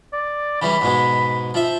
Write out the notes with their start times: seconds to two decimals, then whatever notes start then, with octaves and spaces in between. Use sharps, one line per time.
0.13 D5
0.62 C#3 E3 G3 B5
0.81 G#2 B2 G#3
1.54 F3 E5